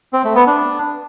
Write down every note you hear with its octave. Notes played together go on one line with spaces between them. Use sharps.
C4
A3
B3
D4